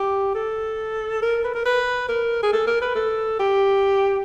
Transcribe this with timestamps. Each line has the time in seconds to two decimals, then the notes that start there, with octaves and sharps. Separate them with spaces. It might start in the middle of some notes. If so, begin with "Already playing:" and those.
Already playing: G4
0.35 A4
1.22 A#4
1.44 B4
1.55 A#4
1.65 B4
2.09 A#4
2.43 G#4
2.53 A4
2.67 A#4
2.82 B4
2.95 A4
3.40 G4